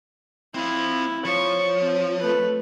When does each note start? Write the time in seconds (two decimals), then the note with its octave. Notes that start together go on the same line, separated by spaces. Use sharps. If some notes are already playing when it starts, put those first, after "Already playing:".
0.55 C4 E4 F5
1.25 F3 C#5 C#6
1.81 C4
2.20 A3 B4